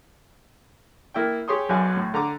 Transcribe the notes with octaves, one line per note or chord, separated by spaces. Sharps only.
A#3 E4 D5 G5
G4 G#4 C#5 C6 C#6 D#6
B1 F#2 F#3 D5 G#5
A2
D3 A#5 D6